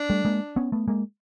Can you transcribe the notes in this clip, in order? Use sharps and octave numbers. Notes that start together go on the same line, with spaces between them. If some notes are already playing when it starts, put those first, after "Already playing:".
Already playing: D4
G3 A3
G#3 A#3
B3 C#4
A3 B3
G#3 A#3